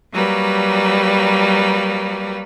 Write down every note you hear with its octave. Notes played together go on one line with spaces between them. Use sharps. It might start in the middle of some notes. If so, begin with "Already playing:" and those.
F#3 G3 A#3 B4